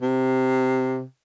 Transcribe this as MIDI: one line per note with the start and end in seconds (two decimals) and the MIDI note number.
0.02 1.02 48